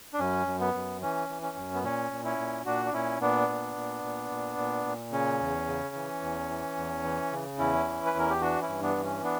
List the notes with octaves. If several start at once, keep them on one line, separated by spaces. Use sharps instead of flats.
D4
F#2 C#4
F#2
B3
F#2
E3 C#4
E3
C#4
F#2
B3
A#2 C#4
A#2
C#4 E4
A#2
A#2 D4 F#4
D4
A#2 C#4 E4
A#2 B3 D4
A#2
A#2
A#2
A#2
A#2
A#2
C#3 C#4
E2
C#3
E3
E2
E3
E2
E3
C#3
E2 C#4 E4
E3
B4
E2 A#4
G4
E3 D4 F#4
C#4 E4
G2
B3 D4
E3
C#4
B3 D4